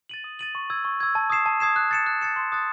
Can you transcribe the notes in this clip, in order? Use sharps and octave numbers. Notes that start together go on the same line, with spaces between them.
A6 D#7 F#7
D#6
A6 D#7 F#7
C#6
E6 G#6
C#6
E6 G#6
A5
D#6 G#6 C7 E7
A5
D#6 G#6 C7 E7
F#6
A6 C#7 E7
F#6
A6 C#7 E7
C6
D#6 F#6 A6